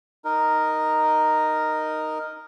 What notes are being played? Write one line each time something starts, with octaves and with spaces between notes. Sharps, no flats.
D#4 A#4